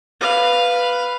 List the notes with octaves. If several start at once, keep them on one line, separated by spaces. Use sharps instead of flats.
B4 F5